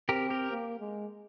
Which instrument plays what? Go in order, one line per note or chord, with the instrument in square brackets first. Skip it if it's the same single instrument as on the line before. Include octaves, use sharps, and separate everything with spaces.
[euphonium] C4 [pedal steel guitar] G4 A#4
[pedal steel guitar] G4 A#4
[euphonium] A#3
G#3